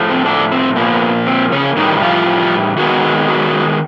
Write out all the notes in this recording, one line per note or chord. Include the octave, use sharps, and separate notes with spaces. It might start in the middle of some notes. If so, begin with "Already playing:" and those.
Already playing: A2 F3 A3
C4
D3 D4
C4
A#2 F3 A#3 B3
C4
C#3 C#4
A2 D#3 E3 G3 D#4
F3 F4
D#3 F#3 G#3 B3 F#4
F#3 F#4